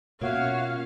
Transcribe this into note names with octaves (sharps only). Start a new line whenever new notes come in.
B2 A#3 C#4 F4 F#4 C#5 E5 F5